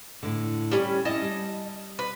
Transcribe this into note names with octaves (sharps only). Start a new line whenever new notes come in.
A2 D3
G3 C#4
C#4 E4 D#5 A5
G3
B4